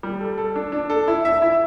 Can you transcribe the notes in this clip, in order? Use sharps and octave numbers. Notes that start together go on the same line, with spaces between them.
G3
A4
A4
D4
D4
A4
E4
E5
E4